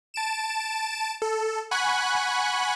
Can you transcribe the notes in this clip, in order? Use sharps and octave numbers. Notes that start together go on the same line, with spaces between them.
A5 D7 E7
A4
F#5 G#5 B5 C#6 F#6